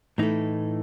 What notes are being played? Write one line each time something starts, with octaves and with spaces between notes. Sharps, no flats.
A2 E3 A3 D#4